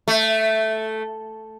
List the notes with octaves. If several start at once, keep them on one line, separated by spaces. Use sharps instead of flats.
A3